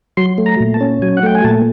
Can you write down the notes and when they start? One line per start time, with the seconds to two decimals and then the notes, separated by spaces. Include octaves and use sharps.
0.17 F#3 C6
0.38 A3
0.46 A#5
0.60 A#2
0.74 A5
0.81 C#4
1.02 F#3 G#5
1.17 F#5
1.23 A3 G5
1.35 G#5
1.44 A#2 A5